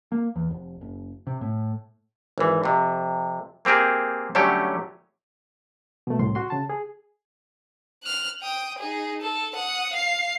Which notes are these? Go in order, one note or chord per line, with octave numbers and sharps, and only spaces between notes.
A#3
E2
F1
F#1
C3
A2
G#1 E3
F2 C3
A#3 C4 G4 G#4 A#4
D3 F#3 G3 A3 C#4 G4
B2 A3
C2 A2 C6
F#4 C6
C#3 A5
G#4
F6 F#6
G5 D#6
D#4 G#4
A4
F#5 D#6
F5 C7